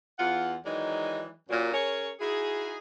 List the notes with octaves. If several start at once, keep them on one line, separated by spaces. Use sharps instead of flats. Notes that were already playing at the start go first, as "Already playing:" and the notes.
E2 F4 F#5
D#3 E3 F#3 G#3 D#4 D5
F#2 A#2 F#3
C#4 G#4 A#4 C#5
D#4 E4 F#4 G#4